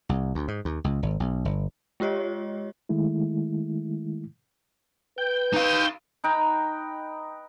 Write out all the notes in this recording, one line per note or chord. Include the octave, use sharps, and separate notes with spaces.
C2
D2
G#2
D#2
C#2
G#1
B1
G1
G#3 F4 G4 C#5 D#5
D#3 G#3 A3 E4
B4 G5 G6
D#4 F5
D#4 B4 G5 A#5